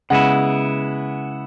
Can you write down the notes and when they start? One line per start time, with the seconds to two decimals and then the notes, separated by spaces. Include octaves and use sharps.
0.10 C#3 G#3 B3 E4 F#5